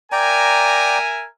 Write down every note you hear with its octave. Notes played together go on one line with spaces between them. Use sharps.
A#4 D5 E5 G5 G#5 A#5